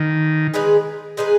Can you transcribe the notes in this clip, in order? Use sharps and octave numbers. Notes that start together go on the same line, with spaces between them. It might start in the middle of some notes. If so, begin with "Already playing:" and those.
Already playing: D#3
G#3 D#4 G#4 B4
G#3 D#4 G#4 B4